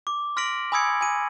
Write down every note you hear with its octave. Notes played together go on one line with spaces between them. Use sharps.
D6
C6 F6 A#6 B6 D7 F#7
G#5 B5 D#6 E6 G#6 C#7
G#5 D#7